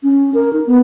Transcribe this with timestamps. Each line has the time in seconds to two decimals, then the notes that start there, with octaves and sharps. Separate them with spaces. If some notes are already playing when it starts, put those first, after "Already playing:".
0.03 C#4
0.34 A#4
0.53 D#4
0.67 B3